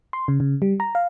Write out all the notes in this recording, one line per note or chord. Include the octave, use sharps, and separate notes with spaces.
C6
C#3
C#3
G3
A#5
F5